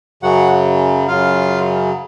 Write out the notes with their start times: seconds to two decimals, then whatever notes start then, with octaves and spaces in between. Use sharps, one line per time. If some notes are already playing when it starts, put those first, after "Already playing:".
0.23 F#2 C#3 F#3 F#4 F#5
1.08 F#2 C#3 F#3 F4 F5